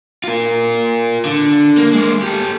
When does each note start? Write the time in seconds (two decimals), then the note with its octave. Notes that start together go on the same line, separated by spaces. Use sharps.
0.24 F4 A#4
1.25 D3
1.77 A#3
1.93 G#3 A#3
2.22 G4 A4